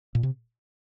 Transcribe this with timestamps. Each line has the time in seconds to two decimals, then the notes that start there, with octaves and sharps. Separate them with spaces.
0.15 A#2
0.23 C3